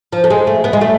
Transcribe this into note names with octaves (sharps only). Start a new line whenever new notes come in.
F3
A3
G#3
A3
B3
G#3
A3